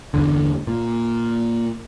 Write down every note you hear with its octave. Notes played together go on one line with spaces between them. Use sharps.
G1 E2 D3
A#2